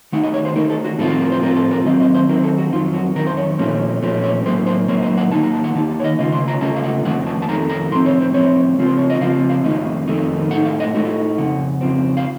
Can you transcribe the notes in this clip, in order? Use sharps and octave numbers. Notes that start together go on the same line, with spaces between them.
D#3 A3 D#4 F#5
D#5
C#5
C5
D#3 A3 D#4 A#4
A4
F#4
A2 F3 C4 F4 A4
F#4
A#4
C5
A2 F3 C4 F4 A#4
A4
A#4
D#3 F#3 C4 D#5
D#5
C5
D#3 F#3 C4 A#4
A4
F#4
F2 D#3 F#3 F4
F#4
F2 D#3 F#3 A#4
C5
C#5
A#2 F3 A3 C#4 C5
A#2 F3 A3 C#4
C#5
A2 F#3 A#3 C5
C5
A2 F#3 A#3 C#5
D#5
F#5
D#3 A#3 D#4 A5
A#5
A5
F#5
D#3 A#3 D#4 A5
A5
C#5
D#5
C#3 A3 C#4 F4 D#5
C6
A#5
C#3 A3 C#4 F4 A5
F5
F#5
F2 D#3 A3 F#5
A5
A5
F2 D#3 A3 A#5
A#5
A2 F3 C4 C6
C#5
C5
A2 F3 C4 C#5
C#3 F3 C4 F4
C5
C#5
D#5
C#3 F3 C4 F4 F5
F5
F2 D#3 A3 D#4 D#5
F2 D#3 A3 D#4
A2 A3 D#4 F#5
F5
D#5
A2 A3 D#4 F#4
F4
F2 C#3 F#5
F2 C#3 F3 C4
F5